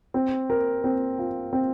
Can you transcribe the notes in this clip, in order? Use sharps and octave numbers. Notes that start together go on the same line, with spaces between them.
C4
A#4
C4
F4
C4